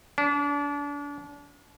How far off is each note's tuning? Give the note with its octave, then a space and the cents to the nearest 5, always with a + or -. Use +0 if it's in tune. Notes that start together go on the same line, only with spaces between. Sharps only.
D4 -35